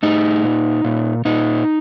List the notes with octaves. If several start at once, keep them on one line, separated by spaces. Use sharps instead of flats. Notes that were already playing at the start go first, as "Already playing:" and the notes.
A2 D#4
A#2
A#2
A#2 D#4